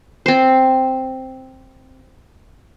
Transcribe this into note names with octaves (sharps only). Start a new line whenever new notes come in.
C4 C5